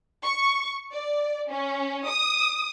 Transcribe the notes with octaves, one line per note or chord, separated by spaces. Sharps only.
C#6
D5
C#4
D#6